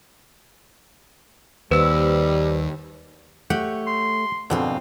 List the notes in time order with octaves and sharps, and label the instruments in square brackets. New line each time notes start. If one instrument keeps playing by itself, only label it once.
[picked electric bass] D#2 [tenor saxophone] G3 [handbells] B4 C5 E6
[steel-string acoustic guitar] A3 C#5 [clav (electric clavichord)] G4 F#5
[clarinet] C6
[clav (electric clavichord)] F2 B2 D3 [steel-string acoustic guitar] G#2 C4 F4